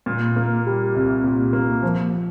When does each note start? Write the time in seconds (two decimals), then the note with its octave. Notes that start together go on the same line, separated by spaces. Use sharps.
0.06 A#2
0.36 A#3
0.66 G3
0.95 C2
1.24 A#2
1.53 A#3
1.83 F3